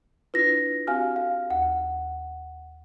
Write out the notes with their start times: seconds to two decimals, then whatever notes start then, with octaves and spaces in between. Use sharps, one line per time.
0.34 D4 E4 F4 B4 A#6
0.87 C4 F#4 G4 F5 G#5 F6
1.16 A4 F5
1.50 D#2 F#5